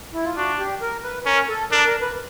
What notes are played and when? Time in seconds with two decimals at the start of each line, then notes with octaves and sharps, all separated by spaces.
0.14 E4
0.25 F4
0.36 D4 F#4
0.59 G4
0.82 A#4
1.04 B4
1.26 C#4 A#4
1.49 A4
1.71 D4 A#4
1.86 A#4
2.01 B4